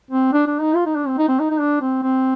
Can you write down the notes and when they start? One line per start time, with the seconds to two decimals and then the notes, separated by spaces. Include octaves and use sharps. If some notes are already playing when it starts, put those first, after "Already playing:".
0.11 C4
0.33 D4
0.46 D4
0.61 D#4
0.75 F4
0.86 D#4
0.96 D4
1.07 C4
1.18 D#4
1.28 C4
1.40 D#4
1.50 D#4
1.60 D4
1.82 C4
2.03 C4